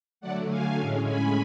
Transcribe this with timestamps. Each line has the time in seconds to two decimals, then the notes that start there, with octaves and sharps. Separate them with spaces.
0.21 D3 F#3 A3 D5 F#5
0.50 F5 G#5
0.79 A2 G#3 C#4
1.07 G#5 B5